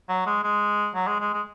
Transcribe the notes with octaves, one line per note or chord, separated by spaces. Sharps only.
F#3
G#3
G#3
F#3
G#3
G#3
G#3